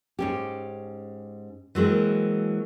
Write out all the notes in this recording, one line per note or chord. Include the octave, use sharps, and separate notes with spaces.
G#2 C#4 G4
E3 F#3 G#3 A#3 C4